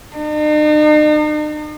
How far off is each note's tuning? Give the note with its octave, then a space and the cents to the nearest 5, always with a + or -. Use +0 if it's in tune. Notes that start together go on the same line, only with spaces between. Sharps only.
D#4 -45